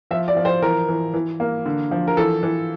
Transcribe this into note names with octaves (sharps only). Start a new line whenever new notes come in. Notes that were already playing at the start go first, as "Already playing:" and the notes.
F3 E5
D5
F3
C5
E3 A#4
E3
E3
A#3
D3
F3
A#4
E3 A4
E3